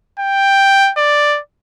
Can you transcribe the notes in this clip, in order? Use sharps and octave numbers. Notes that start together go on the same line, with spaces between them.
G5
D5